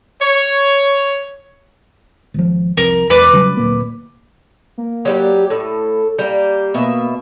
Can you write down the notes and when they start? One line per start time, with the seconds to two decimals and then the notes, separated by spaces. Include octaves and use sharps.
0.22 C#5
2.34 G#1 F3
2.77 C2 F2 A#4
3.10 E1 E2 B4 D5
3.33 C#3 F#3 G3
3.57 D1 A#2 A#3
4.78 A#3
5.05 F#3 G3 G4
5.50 A2 A4
6.19 G3 A#3 G6
6.74 B2 A#3 E5